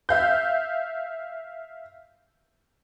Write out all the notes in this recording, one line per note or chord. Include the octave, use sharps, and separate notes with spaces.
E5 F5 G6